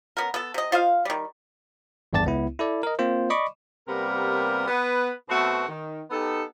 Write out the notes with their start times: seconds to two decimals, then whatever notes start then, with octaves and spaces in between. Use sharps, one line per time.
0.17 B3 C#4 A#4
0.34 B3 A4
0.54 C3 D#5
0.72 F4 C5 D#5 F5
1.05 D#3 G3
2.13 G#1 E2 G2 D5 A5 A6
2.25 C#2 B3 E4
2.59 E4 A4 D5
2.83 A#4 D#5
2.99 A#3 C4 F4 C5
3.30 D5 D#5 B5 C#6 D6
3.88 C3 G3 A#3 B3 A#4
4.68 B3 B4
5.29 B2 A3 B3 C4 F#4
5.68 D#3
6.11 B3 D#4 G4 A4